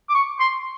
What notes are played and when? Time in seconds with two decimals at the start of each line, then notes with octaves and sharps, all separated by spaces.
0.09 D6
0.15 C#6
0.40 C6